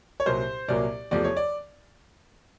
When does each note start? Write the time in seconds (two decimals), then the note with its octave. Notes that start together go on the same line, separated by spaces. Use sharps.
0.20 C#5
0.26 C2 A#2 F#3 A#3 C5
0.68 C2 A#2 F#3 A#3 D5
1.11 E2 C3 F3 A3 D5
1.24 C#5
1.37 D5